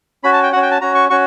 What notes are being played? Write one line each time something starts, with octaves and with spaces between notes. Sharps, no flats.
C#4 F#4 B5
A5
G5
C#4 F#4 F#5
G5
A5
C#4 F#4 A#5
C#6
C#4 F#4 C#6